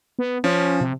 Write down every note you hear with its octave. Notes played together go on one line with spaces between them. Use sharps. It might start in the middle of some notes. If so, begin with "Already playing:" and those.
B3
F3 C#4
C3